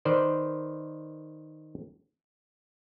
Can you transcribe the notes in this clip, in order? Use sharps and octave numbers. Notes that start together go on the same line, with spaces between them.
D#3 B4 C5 D5